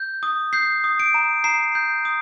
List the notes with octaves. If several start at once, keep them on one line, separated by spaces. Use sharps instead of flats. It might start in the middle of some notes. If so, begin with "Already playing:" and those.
Already playing: G6
D#6
G6 C7
D#6
D7
A#5
A#5 C7
G6
D#6